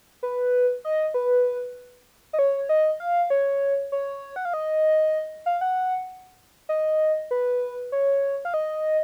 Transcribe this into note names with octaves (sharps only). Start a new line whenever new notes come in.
B4
D#5
B4
D#5
C#5
D#5
F5
C#5
C#5
F#5
F5
D#5
F5
F#5
D#5
B4
C#5
F5
D#5